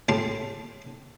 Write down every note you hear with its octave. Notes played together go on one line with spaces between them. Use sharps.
A2 A3 G4 A5 C6